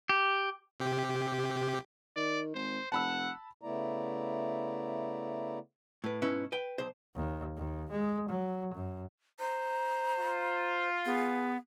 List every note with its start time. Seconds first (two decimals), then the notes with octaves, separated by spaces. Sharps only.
0.09 G4
0.80 C3 G4
2.16 D#3 D5
2.55 G#1 C5
2.92 F1 F#5 A5 B5 E6
3.62 C#3 A3 B3 E4 D5 A#5
6.04 A2 B4
6.22 G#2 B2 C#4 E4 B4 C#5
6.52 B4 G5
6.78 B1 C5
7.15 D#2
7.57 D#2
7.90 G#3
8.29 F#3
8.74 F#2
9.39 C5 A#5
10.18 F4
11.06 B3 G#4